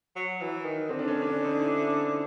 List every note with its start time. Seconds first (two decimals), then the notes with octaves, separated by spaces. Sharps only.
0.16 F#3
0.41 E3
0.65 D#3
0.89 D3 C4
0.99 D4
1.08 C#4
1.22 C#4
1.27 D4
1.44 D#4
1.63 E4
1.87 D4